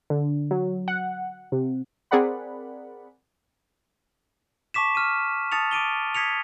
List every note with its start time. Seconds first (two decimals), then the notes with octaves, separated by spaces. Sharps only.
0.10 D3
0.51 F#3
0.88 F#5
1.52 C3
2.11 C4 G#4 A#4 D5 F#5 B5
4.74 A5 C#6 D6 B6 E7
4.95 F6 D#7
5.52 A5 D#6 A6 C#7 F7
5.71 D6 D7 D#7 G7
6.15 D#6 G#6 B6 C#7 F7